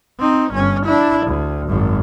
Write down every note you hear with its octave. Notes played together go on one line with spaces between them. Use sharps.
C4 D#4
G1 C#4
D4 E4
D2
G#1 F#2